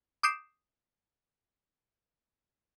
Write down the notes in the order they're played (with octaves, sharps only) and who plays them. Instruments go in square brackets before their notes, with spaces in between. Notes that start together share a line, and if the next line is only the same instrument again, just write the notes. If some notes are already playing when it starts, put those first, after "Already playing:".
[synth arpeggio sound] D6 D#6 G6 C7 D7 E7